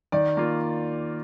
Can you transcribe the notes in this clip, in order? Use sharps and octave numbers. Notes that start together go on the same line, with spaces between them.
D#3 D5
A#3 F4